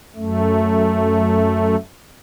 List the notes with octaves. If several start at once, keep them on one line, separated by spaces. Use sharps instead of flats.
F#2 A3